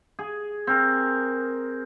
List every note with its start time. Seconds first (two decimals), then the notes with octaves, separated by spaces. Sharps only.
0.19 G#4
0.67 C4 A#4